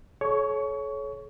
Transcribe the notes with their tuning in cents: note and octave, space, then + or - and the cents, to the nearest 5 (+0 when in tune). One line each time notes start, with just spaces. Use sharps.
A4 -40 C#5 +0 C#6 +25